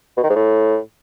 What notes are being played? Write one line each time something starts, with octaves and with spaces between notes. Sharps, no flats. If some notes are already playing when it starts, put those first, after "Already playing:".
B2
D#3
G#2
A2